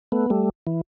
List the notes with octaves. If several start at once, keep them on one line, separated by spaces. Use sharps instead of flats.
A3 B3
G3 A3
E3